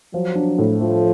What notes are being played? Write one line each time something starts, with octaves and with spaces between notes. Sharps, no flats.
F3 F#3
D4
A2
F3 A3